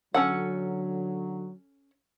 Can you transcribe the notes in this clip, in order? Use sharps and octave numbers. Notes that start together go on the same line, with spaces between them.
D3 F#3 C#4 A4 F#5